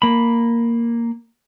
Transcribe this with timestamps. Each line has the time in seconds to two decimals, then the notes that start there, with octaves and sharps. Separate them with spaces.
0.02 A#3 B5